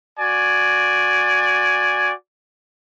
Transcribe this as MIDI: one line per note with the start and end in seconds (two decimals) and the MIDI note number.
0.19 2.13 66
0.19 2.13 74
0.19 2.13 80